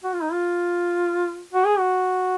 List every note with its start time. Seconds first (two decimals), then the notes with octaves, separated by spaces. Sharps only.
0.04 F#4
0.14 F4
0.22 D#4
0.32 F4
1.53 F#4
1.66 G#4
1.79 F#4